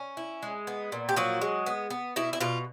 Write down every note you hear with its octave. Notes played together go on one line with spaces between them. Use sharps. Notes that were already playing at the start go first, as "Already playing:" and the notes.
Already playing: C#4
E4
G#3
B3
A#2
G4
F3 F#3 F#4
G#3
B3
B3
B2 E4
E4
B2 F4